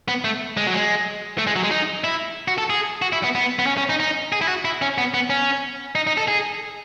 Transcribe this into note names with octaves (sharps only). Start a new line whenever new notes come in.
B3
A3
G#3
F#3
G#3
A3
G#3
F#3
G#3
D#4
E4
F#4
A4
G#4
F#4
E4
B3
B3
B3
C#4
C#4
D#4
D#4
G#4
E4
F#4
E4
C#4
B3
B3
C#4
D#4
D#4
A4
G#4